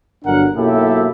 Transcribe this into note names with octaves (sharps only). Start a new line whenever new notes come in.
G1 F#3 D4 A#4 F#5
B1 F#2 A#3 E4 G4 A4